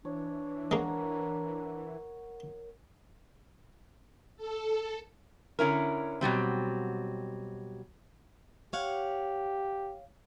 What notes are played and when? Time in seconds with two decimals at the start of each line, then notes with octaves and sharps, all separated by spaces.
0.05 E3 D4 C#5
0.71 G#3 A#3 A#4 C#5 F#5
4.36 A4
5.59 D3 C#4 E4 A#4
6.21 B2 F#3 G3 C4
8.73 G4 C#5 F5 F#5